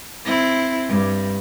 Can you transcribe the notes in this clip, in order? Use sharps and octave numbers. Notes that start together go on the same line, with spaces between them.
C4 E4
G2